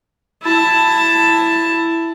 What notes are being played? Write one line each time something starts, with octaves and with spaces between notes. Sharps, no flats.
E4 A5